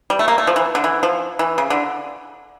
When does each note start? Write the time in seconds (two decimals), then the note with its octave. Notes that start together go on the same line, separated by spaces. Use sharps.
0.10 G3
0.19 A3
0.28 A#3
0.38 A3
0.47 F3
0.56 E3
0.75 D3
0.84 E3
1.03 F3
1.39 E3
1.58 C#3
1.70 D3